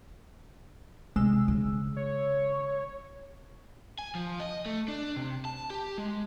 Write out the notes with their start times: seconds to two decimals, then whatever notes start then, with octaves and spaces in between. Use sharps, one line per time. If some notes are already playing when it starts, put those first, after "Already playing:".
1.16 C3 G#3 E6
1.48 C#3
1.96 C#5
3.99 G#5
4.15 F3
4.40 D#5
4.66 A3
4.88 D4
5.16 C3
5.45 A5
5.70 G4
5.98 G#3